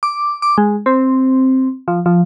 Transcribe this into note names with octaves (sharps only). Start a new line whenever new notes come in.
D6
D6
G#3
C4
F3
F3